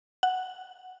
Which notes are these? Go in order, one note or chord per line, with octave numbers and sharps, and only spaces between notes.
F#5